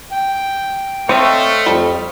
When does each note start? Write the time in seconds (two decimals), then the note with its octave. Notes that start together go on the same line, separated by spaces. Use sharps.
0.11 G5
1.09 A3 C4 C#5 D#5 F5
1.66 F2 F3 G3